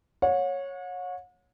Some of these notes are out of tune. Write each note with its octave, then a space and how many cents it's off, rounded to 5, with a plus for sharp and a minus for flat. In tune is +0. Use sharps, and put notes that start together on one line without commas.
C#5 -5 F#5 -40